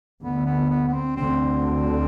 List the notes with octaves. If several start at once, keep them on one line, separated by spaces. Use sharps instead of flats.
D2 D3 B3
B3
B3
B3
C4
D2 D3 C4